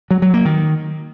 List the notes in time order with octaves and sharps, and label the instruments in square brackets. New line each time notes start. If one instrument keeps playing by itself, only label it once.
[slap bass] F#3
F#3
A#3
D#3